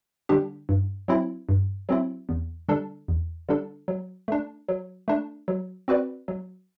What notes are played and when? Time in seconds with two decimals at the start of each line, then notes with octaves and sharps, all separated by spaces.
0.29 D3 G3 D4 G4
0.69 G2
1.08 F#3 C4 E4
1.49 G2
1.89 F#3 C4 E4
2.29 E2
2.69 D3 G3 D4 A4
3.08 E2
3.49 D3 G3 D4 A4
3.88 F#3
4.28 A3 D4
4.69 F#3
5.08 A3 D4
5.48 F#3
5.88 C4 F#4 B4 D5
6.28 F#3